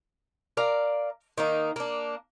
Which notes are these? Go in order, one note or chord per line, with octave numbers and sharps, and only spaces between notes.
A#4 D5 F5 A#5
D#3 A#3 D#4
A#3 D4